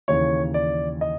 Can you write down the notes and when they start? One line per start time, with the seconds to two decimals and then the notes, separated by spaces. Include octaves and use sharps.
0.08 D#2 C#3 E3 C#5
0.54 D5
1.01 D#5